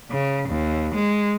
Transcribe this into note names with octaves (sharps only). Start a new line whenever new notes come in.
C#3
D#2
G#3